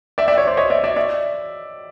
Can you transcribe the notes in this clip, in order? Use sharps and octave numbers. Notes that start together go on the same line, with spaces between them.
D5 E5
D5 E5
C#5
C5 D5
C#5 D#5
D5 E5
D5 E5
D5 E5